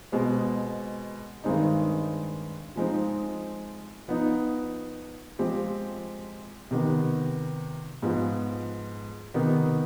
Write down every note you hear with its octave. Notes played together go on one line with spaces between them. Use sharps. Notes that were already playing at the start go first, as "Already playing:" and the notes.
B2 G#3 C4
G2 D#3 G#3 C4 D#4
F3 G#3 C4 D#4
F3 B3 D#4
F3 G#3 C4 G4
C3 D#3 B3
G#2 F3 B3
C3 D#3 B3 D#4